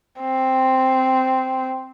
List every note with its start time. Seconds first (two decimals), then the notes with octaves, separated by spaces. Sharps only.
0.21 C4